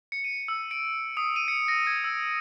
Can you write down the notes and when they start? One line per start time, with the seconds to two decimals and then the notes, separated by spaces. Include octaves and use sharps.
0.12 C#7
0.24 D#7
0.48 E6
0.71 D7
1.17 D#6
1.36 D#7
1.48 C#7
1.68 A#6
1.87 G#6
2.04 E6